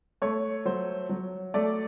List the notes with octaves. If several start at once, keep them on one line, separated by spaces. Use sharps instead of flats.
A3 C#5
F#3 C5
F#3
A3 D5